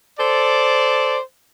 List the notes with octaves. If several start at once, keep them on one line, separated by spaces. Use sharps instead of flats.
A4 C5 D5